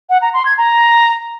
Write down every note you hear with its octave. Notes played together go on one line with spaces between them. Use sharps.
F#5
A#5
C6
G#6
A#5